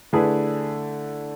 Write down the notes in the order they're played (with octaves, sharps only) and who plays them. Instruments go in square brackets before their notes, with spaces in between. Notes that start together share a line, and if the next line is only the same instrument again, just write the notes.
[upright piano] D3 A3 E4 G#4 B4